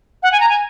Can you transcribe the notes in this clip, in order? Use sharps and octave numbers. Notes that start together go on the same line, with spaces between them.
F#5
G#5
A#5
G#5